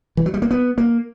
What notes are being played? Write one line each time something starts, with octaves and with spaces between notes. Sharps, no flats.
E3
F#3
G3
A#3
B3
A#3